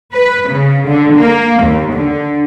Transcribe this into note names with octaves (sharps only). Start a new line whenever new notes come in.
B4
C#3
D3
A#3
D#2
D3